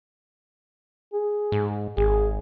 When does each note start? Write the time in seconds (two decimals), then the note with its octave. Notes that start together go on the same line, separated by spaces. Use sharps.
1.13 G#4
1.52 G#2
1.97 G#1 G#4